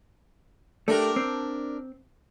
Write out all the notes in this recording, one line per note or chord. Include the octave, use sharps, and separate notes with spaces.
A3 D4 G4 A#4
C4